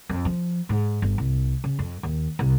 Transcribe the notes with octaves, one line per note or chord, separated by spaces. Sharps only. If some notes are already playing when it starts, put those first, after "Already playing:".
F2
F3
G#2
G1
C2
C#3
F2
D#2
C2